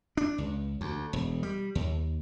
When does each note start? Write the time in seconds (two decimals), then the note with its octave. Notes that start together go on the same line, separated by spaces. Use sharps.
0.17 D4
0.38 C#2
0.81 D2
1.13 E1
1.43 G3
1.75 D#2